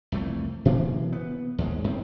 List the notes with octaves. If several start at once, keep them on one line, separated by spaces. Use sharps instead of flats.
C2 F2 E3 A3
B2 E3 F#3 A#3
B3
D#2 G#2 G#3
F#2 A2 D#3 C4